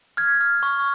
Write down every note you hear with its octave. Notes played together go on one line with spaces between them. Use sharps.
F6 G#6
F6
C#6